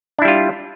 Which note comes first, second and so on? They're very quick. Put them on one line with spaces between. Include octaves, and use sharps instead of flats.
D4 E4 G3 F4